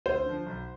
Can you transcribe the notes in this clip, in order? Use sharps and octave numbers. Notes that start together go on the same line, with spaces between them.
D2 C5
D3 F3
B1